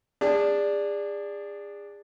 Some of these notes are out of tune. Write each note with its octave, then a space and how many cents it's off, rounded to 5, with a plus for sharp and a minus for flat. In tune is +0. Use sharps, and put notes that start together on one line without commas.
D4 +0 G#4 -30 A5 +0